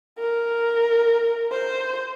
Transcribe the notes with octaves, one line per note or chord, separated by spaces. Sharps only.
A#4
C5